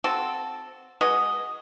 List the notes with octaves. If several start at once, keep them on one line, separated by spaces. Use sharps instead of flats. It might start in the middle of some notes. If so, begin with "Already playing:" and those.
C4 F#4 A4
G#3 F#4 B4 D#5